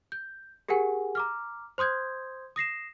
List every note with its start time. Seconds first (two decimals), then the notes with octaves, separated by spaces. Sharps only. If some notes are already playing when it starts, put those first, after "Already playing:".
0.12 G6
0.69 G4 G#4 A#4 F#5 G#5
1.15 A#5 D6 F6
1.78 C5 C6 D#6 G6 G#6
2.56 D#6 A#6 C7 E7